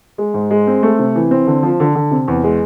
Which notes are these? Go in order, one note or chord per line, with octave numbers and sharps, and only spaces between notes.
G#3
G#2
G#3
C4
A3
C3
E3
C4
D3
F3
D3
D3
C3
E2
G#3